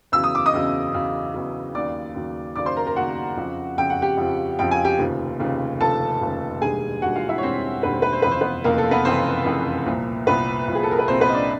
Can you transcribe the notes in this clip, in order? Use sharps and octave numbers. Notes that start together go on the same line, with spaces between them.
E2 C#3 F#3 E6
D#6
D6
D#5 D#6
E2 C#3 F#3
E2 C#3 F#3
E2 C#3 F#3
D#2 C#3 F#3 D5 D6
D#2 C#3 F#3
D#2 C#3 F#3 D5 D6
C5 C6
A#4 A#5
A#4 A#5
D#2 C#3 F#3 F#4 F#5
F2 C#3 F3
F2 C#3 F3 G5
F#5
G4 G5
F2 C#3 F3
F2 C#3 F3 G5
G#5
G4 G5
F1 D#2 C#3 F3
F1 D#2 C#3 F3
F1 D#2 C#3 F3 A4 A5
F1 D#2 C#3 F3
E1 D#2 D3 G3 G#4 G#5
E1 D#2 D3 G3 F#4 F#5
F4 F5
E4 E5
C#5
E1 D#2 D3 G3 C4 C5
E1 D#2 D3 G3 B4
C5
B4
C5
F1 F2 C#3 E3 B4
C5
B3 B4
F1 F2 C#3 E3 A#3 A#4
A4
B3 B4
F1 F2 C#3 E3 C4 C5
F1 F2 C#3 E3
C2 A#2 F3
C2 A#2 F3 B3 B4
C2 A#2 F3
G#4
A4
A#4
B4
C2 A#2 F3 C4 C5
B3 B4
D#5
D4 D5